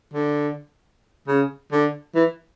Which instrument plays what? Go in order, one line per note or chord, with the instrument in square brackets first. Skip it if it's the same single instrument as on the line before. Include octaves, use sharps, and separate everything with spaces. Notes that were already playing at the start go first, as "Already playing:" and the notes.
[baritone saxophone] D3
C#3
D3
E3